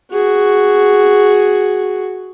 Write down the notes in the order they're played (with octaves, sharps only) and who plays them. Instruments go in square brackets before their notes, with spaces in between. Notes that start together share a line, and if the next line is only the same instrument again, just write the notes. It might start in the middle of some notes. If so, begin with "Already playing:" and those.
[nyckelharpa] F#4 G#4